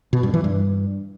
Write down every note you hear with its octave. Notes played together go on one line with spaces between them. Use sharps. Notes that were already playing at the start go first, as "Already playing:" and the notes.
B2
G2
E3
G2